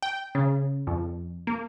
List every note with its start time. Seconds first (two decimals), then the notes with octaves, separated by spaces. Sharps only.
0.03 G5
0.35 C#3
0.87 F2
1.47 A#3